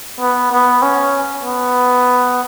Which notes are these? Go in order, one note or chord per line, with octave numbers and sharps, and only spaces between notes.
B3
B3
C#4
B3